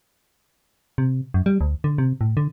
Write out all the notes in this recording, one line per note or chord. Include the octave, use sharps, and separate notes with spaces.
C3
F#2
G3
D2
D3
C3
A2
D3